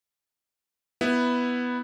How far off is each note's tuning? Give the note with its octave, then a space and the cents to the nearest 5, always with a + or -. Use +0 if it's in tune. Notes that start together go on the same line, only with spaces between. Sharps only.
B3 +0 E4 +0